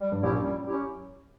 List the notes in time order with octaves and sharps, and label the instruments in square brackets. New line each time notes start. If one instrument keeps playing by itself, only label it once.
[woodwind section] G3
[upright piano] G2
[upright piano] A#1 A#2 [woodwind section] C#4 E4 G4
[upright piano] F#2
[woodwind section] G3
C#4 E4 G4